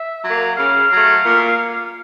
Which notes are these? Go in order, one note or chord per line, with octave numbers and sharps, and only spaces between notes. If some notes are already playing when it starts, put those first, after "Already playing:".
Already playing: E5
F#3 A#3
C#3 F5
F#3 A3
A#2